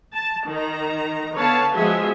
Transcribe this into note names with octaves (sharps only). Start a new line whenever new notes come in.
A5
D#3 A#5
D3 B3 B4 C#5 F5 A5
F3 G#3 B3 F#4 G#4 E5